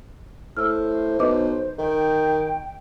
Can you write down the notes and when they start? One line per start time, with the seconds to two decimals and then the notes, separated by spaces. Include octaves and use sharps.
0.57 A2 C5 E6 F6
1.19 B1 B4 D#5 D6
1.78 D#3 G5